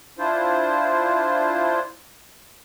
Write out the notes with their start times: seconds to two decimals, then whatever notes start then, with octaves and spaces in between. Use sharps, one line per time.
0.19 D4 E4 F4 C5